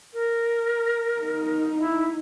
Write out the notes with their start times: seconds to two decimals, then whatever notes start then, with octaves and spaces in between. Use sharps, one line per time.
0.13 A#4
1.21 D#4
1.78 E4